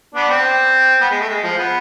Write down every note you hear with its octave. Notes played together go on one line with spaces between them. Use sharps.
B3 D4
C4
B3
G#3
A3
G#3
F3
B3